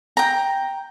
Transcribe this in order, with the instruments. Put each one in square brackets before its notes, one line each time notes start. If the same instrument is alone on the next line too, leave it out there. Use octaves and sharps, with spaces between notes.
[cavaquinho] G5 A#5